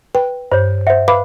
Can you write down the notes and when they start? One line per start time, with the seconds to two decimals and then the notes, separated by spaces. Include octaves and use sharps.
0.15 B4 G5
0.52 G2 C5 C#5
0.87 C5 E5 F#5
1.08 B4 F5 B5 D6